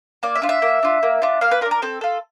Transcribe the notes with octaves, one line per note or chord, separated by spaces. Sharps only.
A#3 D5
E5
D4 F4
E5
A#3
D4 F4
A#3
D4 F4
A#3 F5
B4
F4 A#4
D4
A#4
C4 A4
F4 A4